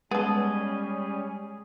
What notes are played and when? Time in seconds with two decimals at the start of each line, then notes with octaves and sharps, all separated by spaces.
0.11 G3 G#3 B3 C#4 G#4 A4 D#5